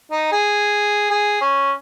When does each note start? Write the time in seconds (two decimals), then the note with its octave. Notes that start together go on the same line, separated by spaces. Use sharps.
0.12 D#4
0.32 G#4
1.11 G#4
1.41 C#4